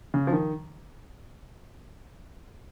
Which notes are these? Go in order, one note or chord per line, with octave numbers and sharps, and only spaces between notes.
C#3
F3
D#3